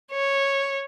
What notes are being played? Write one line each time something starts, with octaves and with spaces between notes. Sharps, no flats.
C#5